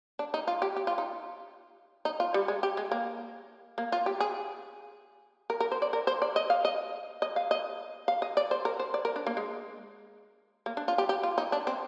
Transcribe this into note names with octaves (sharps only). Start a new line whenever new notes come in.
D4
D#4
F4
G4
G4
F4
D#4
D#4
F4
G3
G#3
G4
G#3
A#3
A#3
F4
G4
G#4
A#4
A#4
C5
D5
A#4
C5
D5
D#5
F5
D#5
D#5
F5
D#5
F5
D#5
D5
C5
A#4
C5
D5
A#4
D4
A#3
G#3
A#3
D4
F4
G4
G4
F4
D#4
D4
C4